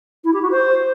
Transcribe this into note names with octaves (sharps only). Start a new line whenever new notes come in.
E4
G4
F#4
C5